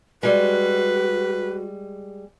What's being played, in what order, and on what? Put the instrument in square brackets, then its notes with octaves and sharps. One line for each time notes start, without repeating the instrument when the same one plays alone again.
[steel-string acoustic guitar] G3 G#3 [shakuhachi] F#4 [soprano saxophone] B4